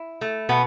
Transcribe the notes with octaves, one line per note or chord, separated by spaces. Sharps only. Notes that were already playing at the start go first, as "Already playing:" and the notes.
Already playing: E4
A3
B2 B3